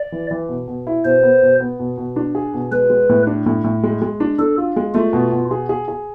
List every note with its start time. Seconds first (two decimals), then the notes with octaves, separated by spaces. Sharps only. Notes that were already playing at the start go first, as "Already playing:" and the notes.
Already playing: D5
0.12 E3
0.31 E3
0.49 B2
0.68 B2
0.87 E4
1.05 B2 C5
1.23 B3
1.42 B2
1.60 B3
1.79 B2
1.98 B2
2.16 D4
2.35 G#4
2.54 B2
2.72 G#3 B4
2.90 G#3
3.09 A2
3.27 D4
3.46 A2
3.64 A2
3.83 G#3
4.02 G#3
4.20 D4
4.39 D4 A4
4.58 F4
4.76 G#3
4.94 A3 F4
5.13 B2
5.32 B2
5.51 G#4
5.69 G#4
5.88 G#4